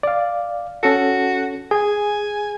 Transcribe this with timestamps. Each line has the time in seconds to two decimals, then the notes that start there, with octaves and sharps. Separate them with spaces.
0.03 D5 F5
0.83 C#4 F#4 A4
1.71 G#4 G#5